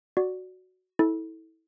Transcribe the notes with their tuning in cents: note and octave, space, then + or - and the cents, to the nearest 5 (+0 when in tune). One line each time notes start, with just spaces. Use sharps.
F#4 +0 D5 +0
E4 -30 A4 -10